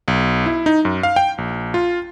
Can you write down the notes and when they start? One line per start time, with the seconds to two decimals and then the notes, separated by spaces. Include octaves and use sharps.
0.08 B1
0.46 E4
0.66 D#4
0.85 F#2
1.03 F5
1.16 G5
1.38 A#1
1.74 F4